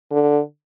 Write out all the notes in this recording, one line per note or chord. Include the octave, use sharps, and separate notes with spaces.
D3